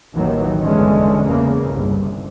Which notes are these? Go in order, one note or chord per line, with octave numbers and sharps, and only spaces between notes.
A1 D#2 D#3 E3 F#3
G1 E2 D3 G#3 C#4
E2 C#3 A#3
G1 C2